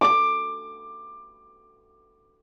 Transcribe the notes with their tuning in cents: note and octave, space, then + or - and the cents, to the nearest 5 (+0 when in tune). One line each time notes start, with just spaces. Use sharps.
D6 +15